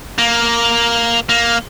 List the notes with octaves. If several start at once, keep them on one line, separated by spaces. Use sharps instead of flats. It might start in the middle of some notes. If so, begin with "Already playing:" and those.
A#3
A#3